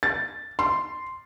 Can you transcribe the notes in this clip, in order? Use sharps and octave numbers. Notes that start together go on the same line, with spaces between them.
A6
C6